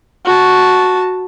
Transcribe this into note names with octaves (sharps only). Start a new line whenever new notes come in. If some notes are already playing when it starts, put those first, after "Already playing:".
F#4 A5